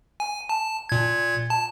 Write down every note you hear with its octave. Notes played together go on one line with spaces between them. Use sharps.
G#5
A5
A#2 G#6
A5